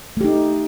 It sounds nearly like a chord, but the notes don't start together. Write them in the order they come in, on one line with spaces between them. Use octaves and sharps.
A3 G4 D#4